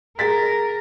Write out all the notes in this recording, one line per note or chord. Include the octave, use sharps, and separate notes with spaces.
G#4 A#4 A6 B6